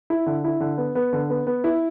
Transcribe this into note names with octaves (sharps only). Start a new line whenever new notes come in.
E4
D3
E4
D3
B3
B3
D3
B3
B3
E4